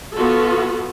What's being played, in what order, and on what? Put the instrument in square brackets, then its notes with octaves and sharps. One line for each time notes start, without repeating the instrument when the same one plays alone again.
[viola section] B3 F4 F#4 A4